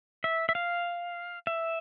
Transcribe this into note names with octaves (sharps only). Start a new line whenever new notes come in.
E5
E5
F5
E5